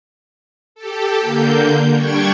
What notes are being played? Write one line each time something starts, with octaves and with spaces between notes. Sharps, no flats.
G4 A4
D3 A#3 G6
G3 D4 G5 C#6 G#6